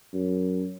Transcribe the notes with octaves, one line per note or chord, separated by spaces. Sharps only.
F#2